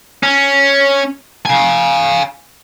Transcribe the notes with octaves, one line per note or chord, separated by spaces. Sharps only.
C#4
F5 G#5